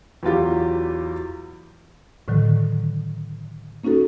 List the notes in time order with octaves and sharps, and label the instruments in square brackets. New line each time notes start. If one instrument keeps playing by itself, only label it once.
[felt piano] E2 F#3 F4 G4
[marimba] A2 D3 D#3 F#3
A#3 C#4 D#4 F#4 A4